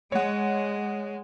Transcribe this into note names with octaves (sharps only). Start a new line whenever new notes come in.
G#3 C#5 F#5